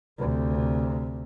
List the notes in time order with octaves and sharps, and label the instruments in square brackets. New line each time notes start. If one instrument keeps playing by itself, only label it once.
[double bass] D2 C3